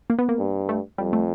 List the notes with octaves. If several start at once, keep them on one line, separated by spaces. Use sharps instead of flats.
A#3
B3
A#3
G2
A3
F2 G3
A3